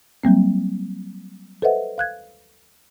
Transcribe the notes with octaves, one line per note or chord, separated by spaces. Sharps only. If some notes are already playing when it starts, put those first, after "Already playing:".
F#3 G3 A#3 C4
A4 B4 C5 D#5 E5 F#5
F5 F#6 G#6